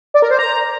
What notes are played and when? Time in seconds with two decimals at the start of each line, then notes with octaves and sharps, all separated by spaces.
0.14 D5
0.22 A#4
0.31 C5
0.39 A#5